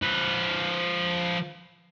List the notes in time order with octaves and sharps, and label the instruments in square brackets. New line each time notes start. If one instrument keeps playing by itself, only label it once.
[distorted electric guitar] F3 B4